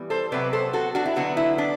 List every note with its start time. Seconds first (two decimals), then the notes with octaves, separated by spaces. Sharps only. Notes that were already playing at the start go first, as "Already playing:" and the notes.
Already playing: E3 G3 B3
0.10 A4 C5
0.32 C3 F#3 B3 B4 D5
0.53 A4 C5
0.73 F#4 A4
0.95 D4 F#4
1.06 E4
1.16 D3 F#3 B3 D4 F#4
1.37 E4
1.58 D4